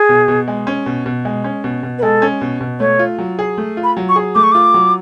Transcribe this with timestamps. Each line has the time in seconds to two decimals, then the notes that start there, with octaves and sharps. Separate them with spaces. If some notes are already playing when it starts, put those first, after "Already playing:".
Already playing: G#4
0.09 B2
0.28 B2
0.48 G#3
0.67 C#4
0.86 B2
1.06 B2
1.25 G#3
1.44 C#4
1.64 B2
1.83 B2
1.99 B4
2.02 G#3 A4
2.22 C#4
2.41 B2
2.61 B2
2.80 A3 C#5
2.99 F4
3.19 F#3
3.39 G#4
3.58 A3
3.77 F4
3.84 B5
3.97 F#3
4.09 C#6
4.16 G#4
4.35 A3 D6
4.43 C#6
4.52 F4 D6
4.74 F#3